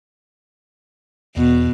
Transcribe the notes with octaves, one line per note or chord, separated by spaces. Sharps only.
E2 B2